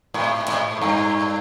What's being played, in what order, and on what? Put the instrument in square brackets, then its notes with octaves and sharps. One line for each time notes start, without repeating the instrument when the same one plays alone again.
[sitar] G#2
G#2
G2